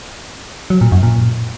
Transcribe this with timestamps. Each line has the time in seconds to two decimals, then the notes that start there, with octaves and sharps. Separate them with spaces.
0.70 F#3
0.81 A#2
0.92 F#2
1.03 A#2